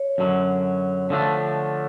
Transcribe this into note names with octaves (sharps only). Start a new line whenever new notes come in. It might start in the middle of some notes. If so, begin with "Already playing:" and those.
Already playing: C#5
F#2 D3 F#3
D3 F3 A3 D4